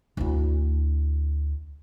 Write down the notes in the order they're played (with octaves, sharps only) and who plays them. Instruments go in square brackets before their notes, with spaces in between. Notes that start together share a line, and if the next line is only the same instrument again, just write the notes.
[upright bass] D2 E4